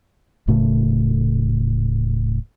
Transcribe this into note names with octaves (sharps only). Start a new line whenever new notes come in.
D#1 A2 C#3 A3